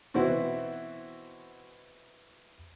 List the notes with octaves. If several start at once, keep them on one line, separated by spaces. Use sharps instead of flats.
B2 E3 C4 E4 F#4